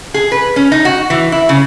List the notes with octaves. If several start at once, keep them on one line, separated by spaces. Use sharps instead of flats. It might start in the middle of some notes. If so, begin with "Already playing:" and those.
G#4
B4
C#4
D#4
F#4
E3
E4
C#3